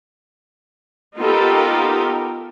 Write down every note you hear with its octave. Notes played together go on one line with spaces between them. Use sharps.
B3 D#4 F4 G4 A4 A#4